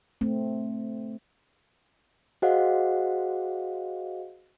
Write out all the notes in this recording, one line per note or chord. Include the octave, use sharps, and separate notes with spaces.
A3 C4
F#4 G#4 C5 D#5 F5 F#5